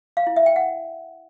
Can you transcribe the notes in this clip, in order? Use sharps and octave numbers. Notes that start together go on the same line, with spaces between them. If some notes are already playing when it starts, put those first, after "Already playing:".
F5
E4
E5
G5
F#5